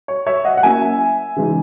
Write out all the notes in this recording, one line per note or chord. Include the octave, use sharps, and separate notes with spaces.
C#5
C#5 E5
D#5 F#5
F#5
F#3 A#3 C#4 E4 E5 G#5
C#3 E3 G#3 D#4